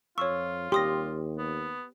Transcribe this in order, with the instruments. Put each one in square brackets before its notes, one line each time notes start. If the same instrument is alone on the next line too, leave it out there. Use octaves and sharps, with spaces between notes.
[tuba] F2 [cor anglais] F4 [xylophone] C#5 C#6 [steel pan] E6
[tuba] D#2 [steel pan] G4 [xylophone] C6 D#6 A#6
[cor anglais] B3